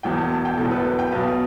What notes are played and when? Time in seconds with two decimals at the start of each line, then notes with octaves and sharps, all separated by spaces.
0.03 E1 E2 B2 G5
0.18 A5
0.31 A5
0.45 G5
0.57 E1 E2 B2 A4
0.71 B4
0.85 B4
0.99 G5
1.12 B1 B2 B4